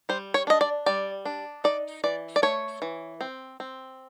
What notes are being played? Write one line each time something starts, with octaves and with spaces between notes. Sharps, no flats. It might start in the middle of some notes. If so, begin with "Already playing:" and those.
G3 C5
C#5
D4 D#5
D5
G3 D5
D4
D#4 D5
E3 D5
D5
A3 C#5
E3
C4
C4